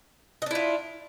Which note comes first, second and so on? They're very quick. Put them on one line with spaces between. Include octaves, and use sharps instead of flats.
D#5 D4 E4 F4